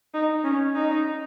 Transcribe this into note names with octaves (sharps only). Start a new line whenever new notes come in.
D#4
C#4
D#4